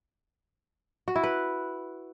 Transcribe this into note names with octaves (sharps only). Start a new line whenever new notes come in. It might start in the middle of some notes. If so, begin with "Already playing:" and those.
F#4
E4
B4